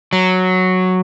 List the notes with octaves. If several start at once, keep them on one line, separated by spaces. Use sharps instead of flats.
F#3